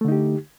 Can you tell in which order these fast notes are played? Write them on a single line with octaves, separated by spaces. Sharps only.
A3 D3 D#4 G4